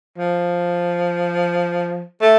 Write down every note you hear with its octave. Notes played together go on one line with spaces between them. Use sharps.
F3
A3